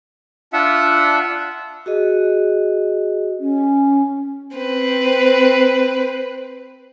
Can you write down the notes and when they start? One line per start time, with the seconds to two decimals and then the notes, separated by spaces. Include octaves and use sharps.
0.53 D4 F4 E5 F#5
1.86 F#4 G#4 D#5
3.40 C#4
4.57 C4 B4